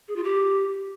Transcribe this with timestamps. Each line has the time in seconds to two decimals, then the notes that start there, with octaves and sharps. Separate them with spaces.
0.08 G#4
0.16 F4
0.24 G4